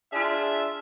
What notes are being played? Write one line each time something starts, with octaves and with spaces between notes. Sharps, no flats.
D4 F4 G#4 E5